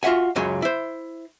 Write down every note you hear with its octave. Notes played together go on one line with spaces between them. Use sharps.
F4 F#4 E5 F#5 G#5
C#2 F#2 C#3 F#3 G#5
E4 C5